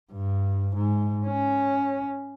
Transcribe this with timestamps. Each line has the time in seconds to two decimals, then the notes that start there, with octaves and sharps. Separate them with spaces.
0.12 G2
0.75 G#2
1.26 C#4